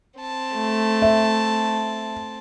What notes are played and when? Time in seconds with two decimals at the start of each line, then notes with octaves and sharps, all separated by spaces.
0.20 C4 A5
0.55 A3
1.02 E5